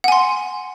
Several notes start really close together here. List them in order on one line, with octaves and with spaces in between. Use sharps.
F#5 G#5 C6